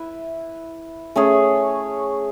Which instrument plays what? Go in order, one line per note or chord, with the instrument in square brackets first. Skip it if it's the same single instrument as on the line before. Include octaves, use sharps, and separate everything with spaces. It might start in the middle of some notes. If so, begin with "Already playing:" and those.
Already playing: [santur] E4 B4 E5
A3 C#4 G#4 C#5